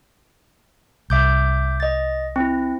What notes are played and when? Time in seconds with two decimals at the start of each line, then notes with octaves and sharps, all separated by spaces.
1.10 C2 E5 D6 G6
1.80 D#5 A6
2.36 C4 E4